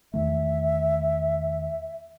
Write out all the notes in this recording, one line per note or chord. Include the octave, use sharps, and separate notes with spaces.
E2 D#3 A3 E5